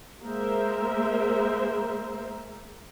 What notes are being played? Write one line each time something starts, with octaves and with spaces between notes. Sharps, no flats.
G#3 A#3 A#4 C5 E5